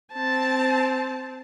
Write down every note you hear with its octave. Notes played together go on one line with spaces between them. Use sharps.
C4 A5